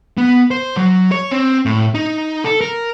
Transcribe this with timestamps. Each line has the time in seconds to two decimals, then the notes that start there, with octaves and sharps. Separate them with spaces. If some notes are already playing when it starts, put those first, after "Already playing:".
0.18 B3
0.51 C5
0.77 F#3
1.12 C#5
1.31 C4
1.65 A2
1.94 D#4
2.44 A4
2.61 A#4